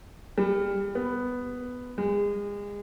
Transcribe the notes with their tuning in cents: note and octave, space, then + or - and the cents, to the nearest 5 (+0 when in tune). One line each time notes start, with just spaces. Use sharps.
G3 +30
B3 +5
G#3 -30